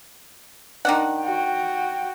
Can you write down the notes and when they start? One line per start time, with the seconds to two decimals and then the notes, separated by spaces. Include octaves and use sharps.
0.85 D#3 D4 F#5
1.20 F#4 G5